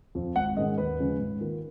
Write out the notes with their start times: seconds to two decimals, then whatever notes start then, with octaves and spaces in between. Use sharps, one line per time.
0.15 F2 F3
0.36 G#1 F#5
0.57 G#2 D#3 G#3 C#4 D#5
0.78 D#2 B4
0.99 C#3 F3 G#3 C#4
1.20 G#2
1.41 D#3 A#3 F4